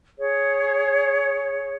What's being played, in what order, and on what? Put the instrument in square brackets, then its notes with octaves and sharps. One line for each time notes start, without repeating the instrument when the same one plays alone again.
[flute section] G#4 C#5